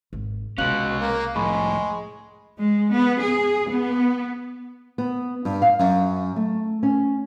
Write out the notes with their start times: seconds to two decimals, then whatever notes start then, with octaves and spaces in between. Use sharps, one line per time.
0.13 G#1
0.58 C2 B2 G#3 C#4 F5 F#6 F#7
1.00 A#3
1.36 F2 A2 G#3 B5 C#6
2.59 G#3
2.92 B3
3.21 G#4
3.69 B3
4.98 B3
5.45 G2
5.62 F5
5.79 F#2
6.36 A3
6.83 C#4